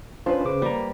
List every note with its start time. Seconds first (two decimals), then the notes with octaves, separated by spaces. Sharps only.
0.26 C#4 D4 F4 B4 C5
0.45 C#3 D6
0.62 G3 A#3 A#5